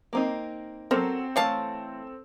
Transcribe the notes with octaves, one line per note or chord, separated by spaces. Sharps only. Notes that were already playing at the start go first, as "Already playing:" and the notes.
A#3 C4 D#4
F#3 C4 A4 A#4 C5
E3 G#3 A3 C#5 F5 A5